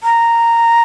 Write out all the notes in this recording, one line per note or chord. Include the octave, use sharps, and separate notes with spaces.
A#5